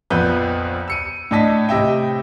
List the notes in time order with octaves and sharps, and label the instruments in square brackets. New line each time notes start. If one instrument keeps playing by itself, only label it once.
[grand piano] A#1 F2 B3 B4 G6
E6 C#7 D#7
A2 D4 D#5 A5 B6
A2 C3 D#5 E5 G5